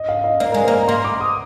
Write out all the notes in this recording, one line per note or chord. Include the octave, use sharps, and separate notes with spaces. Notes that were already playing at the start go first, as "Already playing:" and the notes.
Already playing: D#5
F5
D#5
A#3 D5
G#3 A#4
C5
A#3
A#5
A#3 C6
D6
D#6